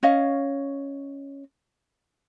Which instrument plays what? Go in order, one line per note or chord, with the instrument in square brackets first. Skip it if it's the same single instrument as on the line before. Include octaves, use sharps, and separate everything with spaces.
[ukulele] C#4 C#5 D#5 F5